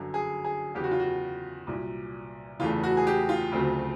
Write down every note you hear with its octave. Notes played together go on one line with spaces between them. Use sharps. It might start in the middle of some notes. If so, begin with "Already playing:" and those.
Already playing: G1 F#2 D3 F#3
G#4
G#4
E2 C#3 F#3 G4
F#4
F4
F#4
C2 A#2 F#3
E1 E2 C#3 E3 A3 F4
F#4
G#4
G4
F4
D2 C#3 F#3 A3 C4